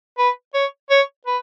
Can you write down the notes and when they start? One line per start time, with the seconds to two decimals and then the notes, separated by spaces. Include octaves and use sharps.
0.18 B4
0.54 C#5
0.90 C#5
1.26 B4